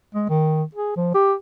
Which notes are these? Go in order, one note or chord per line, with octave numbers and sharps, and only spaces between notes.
G#3
D#3
G#4
F3
G4